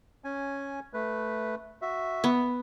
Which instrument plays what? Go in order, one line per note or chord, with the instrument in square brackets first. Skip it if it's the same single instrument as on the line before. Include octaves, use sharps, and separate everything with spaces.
[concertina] C#4 G#5
A3 B4
F#4 E5
[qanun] B3